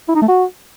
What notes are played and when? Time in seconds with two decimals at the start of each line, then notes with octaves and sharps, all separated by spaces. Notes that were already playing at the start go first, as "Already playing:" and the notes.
0.09 E4
0.15 D#4
0.22 A3
0.28 F#4